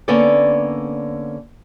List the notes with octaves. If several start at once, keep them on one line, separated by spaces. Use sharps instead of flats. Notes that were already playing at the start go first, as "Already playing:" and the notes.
D3 A#3 B3 C#4 A4 D5